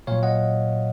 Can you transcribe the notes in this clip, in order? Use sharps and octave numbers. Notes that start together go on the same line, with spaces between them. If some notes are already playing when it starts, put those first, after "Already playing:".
A#2 F#3 C#5 F5
D#5 F#5